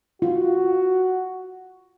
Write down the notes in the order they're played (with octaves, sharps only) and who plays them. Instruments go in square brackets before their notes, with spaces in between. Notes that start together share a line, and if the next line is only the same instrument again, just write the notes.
[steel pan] F4 [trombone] F#4